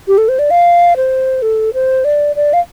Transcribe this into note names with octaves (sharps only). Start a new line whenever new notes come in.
G4
A4
C5
D5
F5
C5
A4
C5
D5
D5
F5